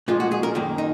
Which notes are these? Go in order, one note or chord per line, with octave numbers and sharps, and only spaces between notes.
A#2 F3 G#3 F4
F#4
G#4
A#4
F#2 D#3 A#3
D#4